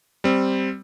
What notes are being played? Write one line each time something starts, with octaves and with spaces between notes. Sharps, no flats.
G3 C4